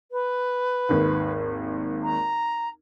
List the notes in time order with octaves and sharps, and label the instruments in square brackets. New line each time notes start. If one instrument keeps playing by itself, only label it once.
[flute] B4
[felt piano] G#1 D#2
[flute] A#5